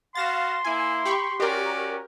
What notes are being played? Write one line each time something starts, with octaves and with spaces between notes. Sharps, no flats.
F#4 F5 C6 A6 A#6 E7
A#3 E4 G#5
G4 B5 C#6
C#4 F#4 G4 A#4 D5